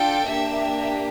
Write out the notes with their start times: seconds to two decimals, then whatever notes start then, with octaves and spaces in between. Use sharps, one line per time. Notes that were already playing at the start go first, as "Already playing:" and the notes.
Already playing: D4 F4 A4 G5
0.29 A#3 D4 G4 E5